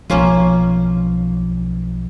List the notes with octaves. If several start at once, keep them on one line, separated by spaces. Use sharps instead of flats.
B1 F3 A#3 C#4 F4